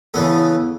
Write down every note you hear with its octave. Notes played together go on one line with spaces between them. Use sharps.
C#3 E3 B3 A4